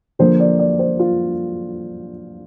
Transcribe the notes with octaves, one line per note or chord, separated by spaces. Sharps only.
D3 F3 A#3 C5
D5
D5
C5
F4